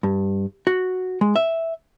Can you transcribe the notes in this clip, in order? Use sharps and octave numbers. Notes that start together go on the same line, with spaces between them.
G2
F#4
G#3
E5